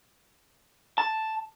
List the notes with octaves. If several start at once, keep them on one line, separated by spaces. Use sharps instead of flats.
A5